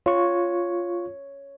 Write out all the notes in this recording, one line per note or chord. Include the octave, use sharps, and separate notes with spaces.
F4 C#5 C#6